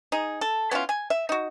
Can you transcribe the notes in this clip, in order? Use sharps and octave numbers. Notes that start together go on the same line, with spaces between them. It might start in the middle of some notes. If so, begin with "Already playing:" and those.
D#4 G#4
A4
B3 C#4 E4 F4
G#5
E5
D#4 F#4